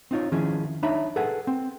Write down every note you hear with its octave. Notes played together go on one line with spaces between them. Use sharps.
C4 D#4 F4 C#5
D#3 F3 C#4 E4 G#4
D4 D#4 C#5 E5 A#5 B5
G#4 A4 B4 F#5 G#5
C4